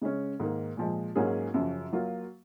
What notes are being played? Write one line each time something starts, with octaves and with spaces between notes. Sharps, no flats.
C#3 G#3 C#4
G#2 D#3 A#3
A#2 F3 G#3
G#2 F#3 A#3 C#4 G#4
F#2 C#3 F3
F#3 A#3 F4